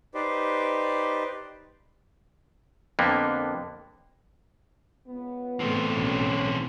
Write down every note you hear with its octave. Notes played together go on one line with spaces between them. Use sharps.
D#4 G4 B4 C5 D5
F2 D3 A#3 B3
C#2 B3
A2 E3 C4
B1 C#4